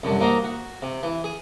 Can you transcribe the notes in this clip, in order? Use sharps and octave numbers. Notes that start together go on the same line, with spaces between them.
C2 F#2 D3
A#3 D#4 F#4 C5 A#5
F#4
C3
E3
G#4